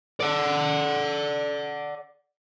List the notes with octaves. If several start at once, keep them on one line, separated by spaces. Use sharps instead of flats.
D5 F#5